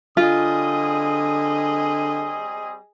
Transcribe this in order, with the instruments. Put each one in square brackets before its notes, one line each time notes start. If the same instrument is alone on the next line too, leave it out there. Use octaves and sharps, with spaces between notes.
[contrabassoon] D3 [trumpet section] G3 C4 D#6 [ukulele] F4 [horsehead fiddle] G#4 D#5